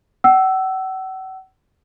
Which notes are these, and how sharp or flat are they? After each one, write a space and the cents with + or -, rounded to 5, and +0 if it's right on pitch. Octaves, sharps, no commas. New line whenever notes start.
F#5 +40 E6 +0